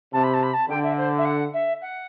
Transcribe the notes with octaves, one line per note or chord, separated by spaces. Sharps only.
C3 A5
B5
A5
B5
A5
D3 G5
E5
C5
E5
F#5
E5
F#5